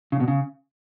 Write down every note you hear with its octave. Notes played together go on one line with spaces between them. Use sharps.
C#3
B2
C#3